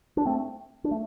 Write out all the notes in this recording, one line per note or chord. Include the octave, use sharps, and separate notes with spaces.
D4
A3 C4
D4
A3